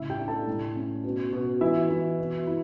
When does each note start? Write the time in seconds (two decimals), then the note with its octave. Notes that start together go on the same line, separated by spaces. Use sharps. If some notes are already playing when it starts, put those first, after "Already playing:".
Already playing: A2 C#3 E4 E5
0.10 G4 G5
0.18 D4
0.28 A4 A5
0.47 A2
0.76 C#4
1.04 B2
1.33 B2
1.61 E3 E4 E5
1.89 E3
2.19 B2
2.47 E4